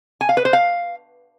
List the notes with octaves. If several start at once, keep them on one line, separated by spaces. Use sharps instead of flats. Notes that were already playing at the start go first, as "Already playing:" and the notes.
G#5
F5
B4
C5
F5